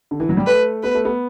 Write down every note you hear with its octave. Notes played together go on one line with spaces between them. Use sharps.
D3
E3
F#3
G3
A3 B4
B3 B4
A3
B3